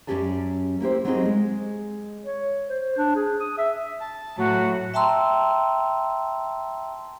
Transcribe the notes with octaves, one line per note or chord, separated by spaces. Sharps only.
F#2 F3 C#4 G4 D5 A5
A#3 E4 G4 C5
F#3 C4 D#4 G4 G#4 D#5
G#3
C#5
C5
D4
G#4
D#6
E5
A5
A2 F#3 F#4
E5 G5 A5 A#5 C6 E6